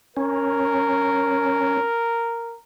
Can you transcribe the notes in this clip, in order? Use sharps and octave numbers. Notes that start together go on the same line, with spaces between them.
C#4 A#4